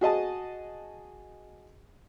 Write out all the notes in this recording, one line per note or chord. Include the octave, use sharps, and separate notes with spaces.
F#4 G#4 D#5 A5